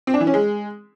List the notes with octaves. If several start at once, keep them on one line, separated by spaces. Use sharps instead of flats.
C4
D4
E3
C#4
G#3